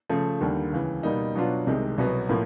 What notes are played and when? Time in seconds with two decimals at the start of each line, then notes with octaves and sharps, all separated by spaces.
0.09 C#3 F3 A3
0.41 D#2 D3 G3 A#3
0.72 C#2 C#3 E3
1.03 B2 G3 A#3 D#4
1.35 B2 F#3 B3 D4 F4
1.67 C2 C3 D#3 G#3
1.98 C2 B2 F#3 B3
2.29 A2 F3 A#3